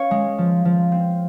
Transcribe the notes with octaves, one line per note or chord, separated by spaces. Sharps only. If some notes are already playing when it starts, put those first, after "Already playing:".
Already playing: C#4 C#5 F5
G#3
F3
F3
C4